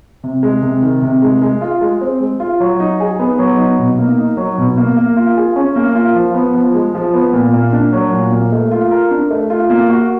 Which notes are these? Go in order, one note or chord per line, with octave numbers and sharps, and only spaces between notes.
C3
G#3
C3
D#3
C3
G#3
G#3
F4
G#3
C4
G#3
F4
F#3
D#4
G#4
B3
F#3
D#4
B2
A#3
D#4
F#3
B2
A#3
A#3
F4
G#4
C#4
A#3
F4
F3
B3
F3
G#3
F3
B3
A#2
A#3
D4
F#3
A#2
A#3
A3
F4
A#4
D4
A3
F4
A#3
F#4